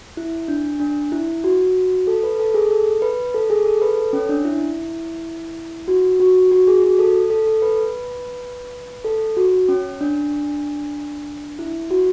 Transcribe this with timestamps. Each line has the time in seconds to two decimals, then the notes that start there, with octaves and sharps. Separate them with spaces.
0.17 E4
0.48 D4
0.80 D4
1.12 E4
1.44 F#4
2.07 A4
2.23 B4
2.39 A4
2.54 G#4
2.71 A4
3.02 B4
3.34 A4
3.50 G#4
3.66 A4
3.82 B4
3.98 A4
4.13 C#4
4.29 D4
4.45 E4
5.88 F#4
6.20 F#4
6.51 F#4
6.67 G#4
6.83 F#4
6.99 A4
7.30 A4
7.46 A4
7.62 B4
9.04 A4
9.37 F#4
9.69 C#4
10.01 D4
11.59 E4
11.91 F#4